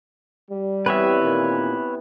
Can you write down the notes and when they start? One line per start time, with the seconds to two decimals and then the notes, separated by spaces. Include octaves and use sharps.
0.51 G3
0.86 C3 E3 B3 B4 C#5 E5
1.22 A#2 D#3